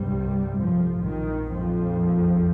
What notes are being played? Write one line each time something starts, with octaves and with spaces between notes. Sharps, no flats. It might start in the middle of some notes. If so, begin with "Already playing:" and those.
Already playing: C2 G2 C3 G3
F2 F3
A#1 G#2 D#3
F2 F3